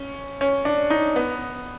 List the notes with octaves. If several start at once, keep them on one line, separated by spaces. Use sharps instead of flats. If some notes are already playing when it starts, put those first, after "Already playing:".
Already playing: C#4
C#4
D4
D#4
B3